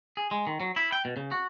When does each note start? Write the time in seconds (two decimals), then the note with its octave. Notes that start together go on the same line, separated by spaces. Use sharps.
0.17 G#4
0.31 G#3
0.47 D#3
0.60 F#3
0.76 E4
0.92 G5
1.05 B2
1.17 C#3
1.31 F#4